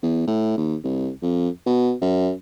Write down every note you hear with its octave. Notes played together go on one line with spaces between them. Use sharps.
E2
A2
D#2
C2
F2
B2
F#2